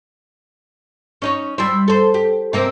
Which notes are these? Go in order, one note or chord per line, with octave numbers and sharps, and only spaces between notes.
C#4 D#4 C#5
G3 E4 C5
A4 C5
G4
C3 A#3 C4